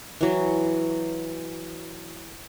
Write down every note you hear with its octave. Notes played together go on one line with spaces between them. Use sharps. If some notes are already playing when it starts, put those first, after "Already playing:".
E3 F#3